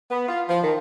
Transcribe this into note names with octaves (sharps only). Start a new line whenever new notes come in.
B3
F4
F3
D#3